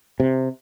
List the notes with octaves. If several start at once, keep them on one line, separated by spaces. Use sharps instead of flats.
C3